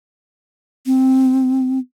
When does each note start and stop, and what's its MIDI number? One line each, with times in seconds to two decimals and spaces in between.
0.86 1.79 60